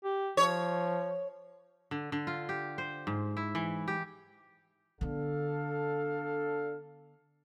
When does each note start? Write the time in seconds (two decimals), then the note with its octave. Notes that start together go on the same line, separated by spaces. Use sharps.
0.04 G4
0.37 F3 C#5
1.91 D3
2.12 D3
2.27 F4
2.49 G4
2.78 C5
3.07 G#2
3.37 E4
3.55 E3
3.88 G4
5.01 D3 B3 D4 A4 F5